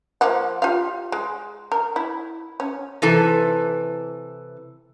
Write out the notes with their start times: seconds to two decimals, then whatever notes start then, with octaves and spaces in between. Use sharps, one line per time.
0.21 F3 A#3 F#5
0.62 F4 G4 F5
1.12 G#3
1.72 A#4
1.96 E4
2.60 C#4
3.02 C3 E3 A4